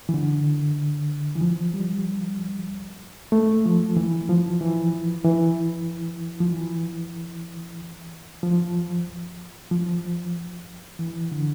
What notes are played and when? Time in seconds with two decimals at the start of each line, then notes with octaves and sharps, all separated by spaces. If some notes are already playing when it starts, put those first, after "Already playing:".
0.09 E3
0.14 D3
1.36 E3
1.41 F3
1.74 G3
3.32 A3
3.65 F3
3.97 E3
4.29 F3
4.61 E3
5.25 E3
6.41 F3
6.53 E3
8.43 F3
9.71 F3
10.99 E3
11.32 D3